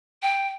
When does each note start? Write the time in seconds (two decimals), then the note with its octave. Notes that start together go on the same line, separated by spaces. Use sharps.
0.22 G5